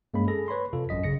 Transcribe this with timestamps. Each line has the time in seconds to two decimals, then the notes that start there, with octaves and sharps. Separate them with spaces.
0.14 G2 G#3 A#3 C#4 B5
0.28 G#4 A4 A#6
0.48 B4 C#5 B5 C6
0.73 F2 C3 F4 A4
0.89 A1 F#2 D#5 B6
1.04 C#3 A#6 C#7